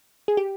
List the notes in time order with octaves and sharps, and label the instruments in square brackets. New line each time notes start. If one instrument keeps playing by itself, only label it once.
[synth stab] G#4
G4